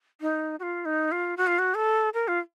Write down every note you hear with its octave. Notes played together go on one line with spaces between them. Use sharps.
D#4
F#4
F4
D#4
F4
F#4
F4
F#4
A4
A#4
F4